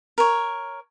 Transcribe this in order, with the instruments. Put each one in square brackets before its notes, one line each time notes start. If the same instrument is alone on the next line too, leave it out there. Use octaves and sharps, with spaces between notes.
[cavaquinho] A#4 C#5